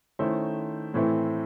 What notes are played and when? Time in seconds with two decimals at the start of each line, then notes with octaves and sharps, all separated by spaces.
0.19 D#3 A3 C#4 E4 C5
0.94 A2 E3 A3 C4 E4